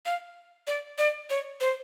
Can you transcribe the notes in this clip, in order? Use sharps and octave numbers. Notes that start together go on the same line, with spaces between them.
F5
D5
D5
C#5
C5